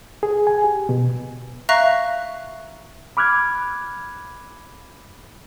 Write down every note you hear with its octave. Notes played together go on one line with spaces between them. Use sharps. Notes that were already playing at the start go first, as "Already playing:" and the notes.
G#4
G#5
G4
B2
E5 F5 A#5 C#6 F#6 A#6
B5 D6 F6 F#6 G#6